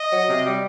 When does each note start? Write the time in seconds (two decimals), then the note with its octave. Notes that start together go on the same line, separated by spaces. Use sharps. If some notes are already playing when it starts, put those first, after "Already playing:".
Already playing: D#5
0.11 F#3
0.28 C3
0.44 G3